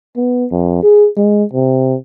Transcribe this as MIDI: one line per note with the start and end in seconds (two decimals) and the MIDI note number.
0.16 0.46 59
0.51 0.81 41
0.83 1.09 68
1.17 1.44 56
1.53 1.95 48